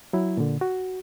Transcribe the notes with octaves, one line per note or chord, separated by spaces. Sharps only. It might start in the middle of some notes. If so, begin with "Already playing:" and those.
F#3 E4
A#2 D3
F#4